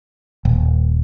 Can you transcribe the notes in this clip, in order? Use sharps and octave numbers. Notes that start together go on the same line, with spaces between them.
D#1